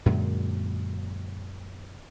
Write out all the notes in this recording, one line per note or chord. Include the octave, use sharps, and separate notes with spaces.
F#2 A#2 D3 G#3